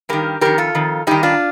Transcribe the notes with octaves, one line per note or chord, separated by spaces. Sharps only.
G2 D#3 G4 A#4
F2 D#3 G4 A#4
F4 A4
F2 D#3
G2 D#3 D#4 G4
D4 F4